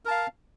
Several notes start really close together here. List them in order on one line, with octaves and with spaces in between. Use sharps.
A#4 A5 F5